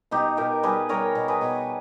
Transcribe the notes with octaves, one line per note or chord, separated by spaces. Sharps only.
B2 D#4 G4
B2 G4 A#4
G3 G#4 B4
G3 A#4 C#5
B2
G#4 B4
B2